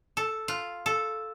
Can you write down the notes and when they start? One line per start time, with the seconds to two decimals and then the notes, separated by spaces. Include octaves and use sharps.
0.17 A4
0.48 F4
0.86 A4